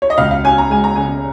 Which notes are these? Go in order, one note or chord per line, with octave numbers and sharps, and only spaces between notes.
C#5
D#5
C#2 F5
F5
C#4 G#5
A#5
G#3 G#5
A#5
C#3 G#5